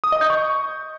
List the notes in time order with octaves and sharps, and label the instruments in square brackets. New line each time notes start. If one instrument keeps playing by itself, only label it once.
[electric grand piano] D#6
D#5
G6
C#6